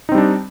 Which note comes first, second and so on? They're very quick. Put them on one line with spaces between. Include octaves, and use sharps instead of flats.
D#4 C4 G3 D4